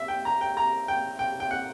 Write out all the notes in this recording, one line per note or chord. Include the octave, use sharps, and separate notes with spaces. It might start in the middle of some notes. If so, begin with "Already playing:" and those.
Already playing: E5
G5
A#5
G5
A#5
G5
G5
G5
F#5